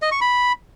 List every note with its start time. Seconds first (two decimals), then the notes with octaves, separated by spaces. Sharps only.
0.02 D#5
0.12 C#6
0.21 B5